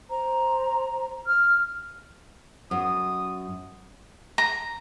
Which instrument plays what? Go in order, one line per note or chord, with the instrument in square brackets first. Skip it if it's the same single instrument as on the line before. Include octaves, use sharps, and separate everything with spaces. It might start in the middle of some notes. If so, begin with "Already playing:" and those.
[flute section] C5 A#5
F6
[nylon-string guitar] F#2 [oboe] D#6
[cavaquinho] A#5